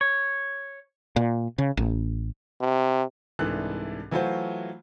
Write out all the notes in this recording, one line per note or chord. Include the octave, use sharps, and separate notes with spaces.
C#5
A#2
C#3
A1
C3
C2 G#2 E3 D4 A4 F#6
E3 F#3 A3 F4 F#4 C5